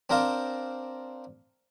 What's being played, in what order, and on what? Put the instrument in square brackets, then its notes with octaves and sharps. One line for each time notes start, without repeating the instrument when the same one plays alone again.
[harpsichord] C4 D4 A#4 C5 F5